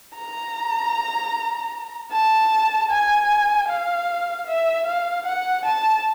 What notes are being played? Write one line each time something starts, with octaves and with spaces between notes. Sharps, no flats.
A#5
A5
G#5
F5
E5
F5
F#5
A5